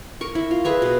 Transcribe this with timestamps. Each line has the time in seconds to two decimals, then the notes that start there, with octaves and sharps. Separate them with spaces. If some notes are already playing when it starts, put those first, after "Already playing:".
0.21 A#4 C#6
0.35 E4
0.51 F4
0.65 G#4 B4 E5 A#5
0.82 B2